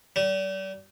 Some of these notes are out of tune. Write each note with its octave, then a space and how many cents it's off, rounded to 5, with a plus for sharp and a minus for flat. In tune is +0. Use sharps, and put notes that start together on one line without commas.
G3 -35